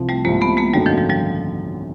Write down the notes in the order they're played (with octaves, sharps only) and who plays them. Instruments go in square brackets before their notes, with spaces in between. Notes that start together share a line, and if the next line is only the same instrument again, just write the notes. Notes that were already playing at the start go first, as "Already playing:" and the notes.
Already playing: [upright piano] C2 C3 F3
[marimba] G3 A3
[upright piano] C2 C3 F3 [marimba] G#3 A#3
[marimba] A3 B3
G#3 A#3
[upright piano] G#1 F#2 D3 F#3 [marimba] G3 A3
[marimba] D#3 F3
F3 G3
F3 G3